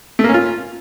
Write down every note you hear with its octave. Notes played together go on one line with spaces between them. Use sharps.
A3
A#3
C#4
F4